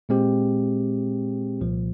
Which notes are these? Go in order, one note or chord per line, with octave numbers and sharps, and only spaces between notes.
A#2 G#3 C4 G4
C2 A#2 F3